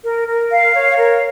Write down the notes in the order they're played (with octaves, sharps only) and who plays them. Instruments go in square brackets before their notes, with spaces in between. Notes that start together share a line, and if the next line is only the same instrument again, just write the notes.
[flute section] A#4
A#4
F5
C#5
A#4